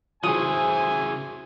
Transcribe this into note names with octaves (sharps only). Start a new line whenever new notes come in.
C#3 E3 E4 F#4 G#4 C5 G#5 D#6